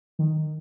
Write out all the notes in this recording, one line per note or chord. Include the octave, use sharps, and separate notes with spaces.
D#3